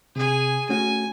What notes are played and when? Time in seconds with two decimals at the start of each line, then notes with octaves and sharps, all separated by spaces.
0.16 C3 G#4 G#5
0.69 A3 C#4 F#4 G#5